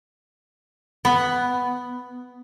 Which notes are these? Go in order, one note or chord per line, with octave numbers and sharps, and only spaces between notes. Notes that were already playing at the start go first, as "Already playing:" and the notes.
B3